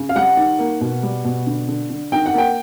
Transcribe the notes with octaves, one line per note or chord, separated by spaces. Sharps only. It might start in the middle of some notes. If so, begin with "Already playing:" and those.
Already playing: C#3
F5
G3 F#5
D#3
A#3
B2
G3
B2
D3
D3
D3
D#3 G5
F#5
A#3 G5